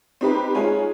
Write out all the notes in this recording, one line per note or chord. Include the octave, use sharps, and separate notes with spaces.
C4 D#4 G4 B4
G#3 D#4 F4 C#5 G#5